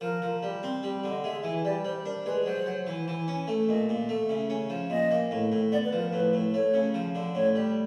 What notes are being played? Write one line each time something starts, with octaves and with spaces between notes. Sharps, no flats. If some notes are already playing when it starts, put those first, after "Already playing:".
F3 A#4
F3
G3
C4
G3
D3
D#5
G#3 E5
E3
G3 D5
G3 C5
D4 A#4
G#3 B4
F#3 C5
F#3
E3
E3
C#4
A3
A#2 D#5
A#2
A3 E5
C#3
C#4
F3
A#2 D#5
A#3
A2
A2
B3 D5
B4
F3
A#4
A2 B4
A2
A3 C#5
C#3
F3
D3
A2 C#5
G3